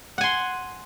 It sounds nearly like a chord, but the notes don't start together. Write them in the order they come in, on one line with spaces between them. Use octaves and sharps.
F#5 G#5 C6